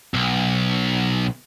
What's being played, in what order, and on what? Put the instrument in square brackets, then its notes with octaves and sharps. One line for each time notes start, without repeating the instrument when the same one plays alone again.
[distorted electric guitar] B1